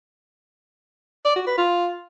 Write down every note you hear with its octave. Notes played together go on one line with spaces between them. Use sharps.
D5
F#4
B4
F4